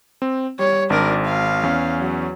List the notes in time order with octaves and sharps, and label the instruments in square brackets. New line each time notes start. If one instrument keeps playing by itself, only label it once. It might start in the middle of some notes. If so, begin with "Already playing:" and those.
[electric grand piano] C4
[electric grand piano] G3 [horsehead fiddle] C#5
[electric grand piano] G#1 [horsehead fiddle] D4 A#4
[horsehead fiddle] F5
[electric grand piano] E2 C#4
[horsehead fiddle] F#3